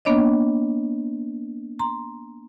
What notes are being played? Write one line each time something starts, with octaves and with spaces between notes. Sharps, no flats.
A#3 B3 D4 C#5 D#5
A#5 C6